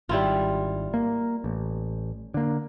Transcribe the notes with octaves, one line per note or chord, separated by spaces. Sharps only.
G#1 G3 E4 F4
A#3
A1
D3 A#3